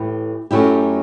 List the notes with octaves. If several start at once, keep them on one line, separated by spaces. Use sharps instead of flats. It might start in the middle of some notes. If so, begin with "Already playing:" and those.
Already playing: A2 E3 A3 E4 G4
F#2 F#3 A3 E4 G4